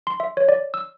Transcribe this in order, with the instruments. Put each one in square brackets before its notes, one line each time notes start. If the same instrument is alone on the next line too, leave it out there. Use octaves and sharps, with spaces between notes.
[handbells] C6
E5
C#5
D5
E6